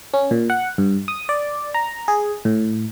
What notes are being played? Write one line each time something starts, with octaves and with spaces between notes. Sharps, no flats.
C#4
A#2
F#5
G2
D#6
D5
A#5
G#4
A2